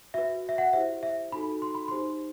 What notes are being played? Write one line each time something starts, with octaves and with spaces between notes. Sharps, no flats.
F#4 B4 E5
E5
F#5
E4 G4 C5 E5
E5
D#4 F#4 A4 B5
C6
B5
D#4 G4 C5 C6